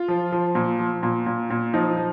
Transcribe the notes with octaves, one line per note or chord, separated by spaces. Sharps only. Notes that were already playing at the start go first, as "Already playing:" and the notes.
Already playing: F4
F3
F3
A#2
F3
A#2
A#2
A#2
F3 D#4
F3